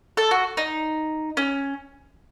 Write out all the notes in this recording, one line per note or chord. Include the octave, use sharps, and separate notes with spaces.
A4
F#4
D#4
C#4